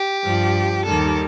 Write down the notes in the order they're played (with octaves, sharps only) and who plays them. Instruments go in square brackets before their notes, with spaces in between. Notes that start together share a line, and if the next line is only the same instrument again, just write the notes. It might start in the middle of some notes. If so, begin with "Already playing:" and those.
Already playing: [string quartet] G4
G2 F3
D#2 D#3 G3 A4